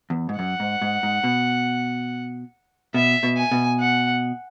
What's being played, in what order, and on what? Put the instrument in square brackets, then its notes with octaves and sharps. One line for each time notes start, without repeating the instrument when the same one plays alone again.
[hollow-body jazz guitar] E2
G#2
[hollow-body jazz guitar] F#2 [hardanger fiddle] F#5
[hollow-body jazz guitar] G#2
G#2
G#2
B2
[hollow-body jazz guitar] B2 [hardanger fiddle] E5
[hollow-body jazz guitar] B2
[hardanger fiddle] G#5
[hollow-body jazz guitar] B2
[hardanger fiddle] F#5